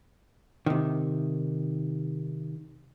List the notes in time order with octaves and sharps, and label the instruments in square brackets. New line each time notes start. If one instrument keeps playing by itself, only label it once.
[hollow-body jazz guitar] C3 D#3